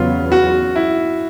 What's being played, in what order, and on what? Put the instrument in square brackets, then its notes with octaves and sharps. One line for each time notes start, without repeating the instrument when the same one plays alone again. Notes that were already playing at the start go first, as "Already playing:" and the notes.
Already playing: [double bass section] E2 C#3 F#3 B3 [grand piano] F4
[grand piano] F#4
E4